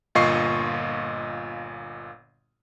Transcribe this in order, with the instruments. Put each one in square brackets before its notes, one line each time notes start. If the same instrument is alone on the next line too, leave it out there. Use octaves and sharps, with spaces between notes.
[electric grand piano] G1 A#2 F4 D#5 C#6 C7